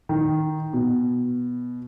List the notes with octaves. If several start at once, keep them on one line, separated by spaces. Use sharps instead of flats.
D#3
B2